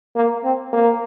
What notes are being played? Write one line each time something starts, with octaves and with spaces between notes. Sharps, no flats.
A#3
C4
A#3